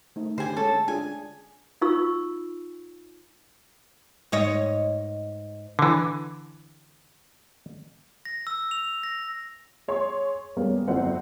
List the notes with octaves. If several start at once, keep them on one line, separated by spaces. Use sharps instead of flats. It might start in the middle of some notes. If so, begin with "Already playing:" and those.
A3 D#4
D3 G4 C5 G#5
G#3 C#4 A4 C#5
D4 F4 G#4 G#5
D#4 F4 C#6 E6
G#2 C#5 D#5
D3 E3
A#6
E6
F7
A#6
G#4 C#5 C6
G3 G#3 A#3 B3 C#4
G1 F2 F#3 C4 E4 F#5